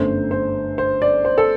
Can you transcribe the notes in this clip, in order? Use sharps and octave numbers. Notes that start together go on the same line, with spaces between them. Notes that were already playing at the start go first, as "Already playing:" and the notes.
Already playing: G1 F#2 D3 A3 C5
C5
C5
D5
C5
A4